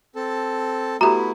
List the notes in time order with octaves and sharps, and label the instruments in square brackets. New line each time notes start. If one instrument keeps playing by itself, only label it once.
[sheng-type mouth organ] C4 A4 A5
[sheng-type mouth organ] A3 B3 E4 [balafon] F#4 G4 [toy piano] A#5